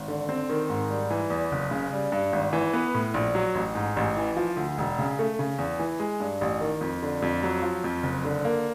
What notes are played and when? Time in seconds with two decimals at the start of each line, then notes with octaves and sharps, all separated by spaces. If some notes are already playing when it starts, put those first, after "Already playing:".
Already playing: G#1
0.08 D3
0.29 C4
0.49 D#3
0.69 G#2
0.90 G3
1.10 E3
1.30 E2
1.52 F#1
1.71 C#3
1.93 G3
2.12 G2
2.33 G#1
2.53 E3
2.73 B3
2.94 A2
3.14 A#1
3.35 F#3
3.55 A1
3.75 G#2
3.97 A1
4.17 E3
4.37 F3
4.57 D2
4.78 E1
4.99 C#3
5.19 A3
5.39 C#3
5.59 E2
5.79 E3
5.99 G#3
6.20 G2
6.41 A1
6.61 D#3
6.81 F2
7.02 D3
7.22 F2
7.43 F#3
7.62 F3
7.84 F2
8.03 F#1
8.25 D3
8.44 A#3